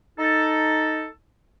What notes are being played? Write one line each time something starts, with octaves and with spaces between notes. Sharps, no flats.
D#4 A4